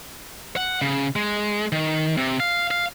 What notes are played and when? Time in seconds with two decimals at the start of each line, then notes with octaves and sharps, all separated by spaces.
0.56 F#5
0.81 C#3
1.16 G#3
1.72 D#3
2.17 C3
2.40 F5
2.71 F5